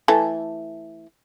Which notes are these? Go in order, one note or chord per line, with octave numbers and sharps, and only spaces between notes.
E3 A3 A5